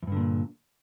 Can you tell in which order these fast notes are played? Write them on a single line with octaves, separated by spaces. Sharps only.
E2 G2 D3 A#2